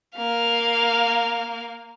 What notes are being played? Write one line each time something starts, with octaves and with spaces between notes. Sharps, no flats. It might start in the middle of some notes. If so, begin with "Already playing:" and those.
A#3 F5